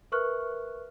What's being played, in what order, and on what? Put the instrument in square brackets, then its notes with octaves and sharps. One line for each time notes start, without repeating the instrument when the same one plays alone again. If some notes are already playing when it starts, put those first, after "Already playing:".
[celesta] A#4 B4 E5 C#6 F6 F#6